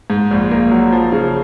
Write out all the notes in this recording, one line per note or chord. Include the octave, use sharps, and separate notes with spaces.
G#2
A#1
A#3
F#3
F3
C#3